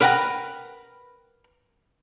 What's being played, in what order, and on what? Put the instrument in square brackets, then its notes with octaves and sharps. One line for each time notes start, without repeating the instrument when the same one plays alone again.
[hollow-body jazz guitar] A#4 B4 F#5 G5 A5 A#5